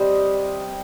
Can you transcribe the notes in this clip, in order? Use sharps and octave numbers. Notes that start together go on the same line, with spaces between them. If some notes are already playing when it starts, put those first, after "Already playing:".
Already playing: C3 G3 C5 D#5